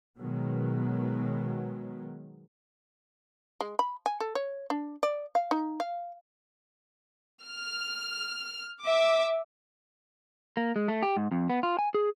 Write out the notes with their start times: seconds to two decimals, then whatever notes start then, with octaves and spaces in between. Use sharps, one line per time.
0.18 B2 D#3 F#3 G#3 B3
3.61 G#3
3.79 B5
4.06 G#5
4.20 A4
4.35 C#5
4.70 D4
5.03 D5
5.35 F5
5.51 D#4
5.80 F5
7.47 F6
8.84 E5 D6
10.57 A#3
10.76 G#3
10.88 A3
11.03 G4
11.17 G#2
11.31 F2
11.50 B3
11.63 F4
11.79 G#5
11.94 G#4